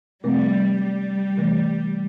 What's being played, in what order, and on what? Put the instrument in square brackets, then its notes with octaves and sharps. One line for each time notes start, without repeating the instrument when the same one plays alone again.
[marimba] C3 F3 A3 C4 [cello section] G3
[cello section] G3
[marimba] C3 E3 A3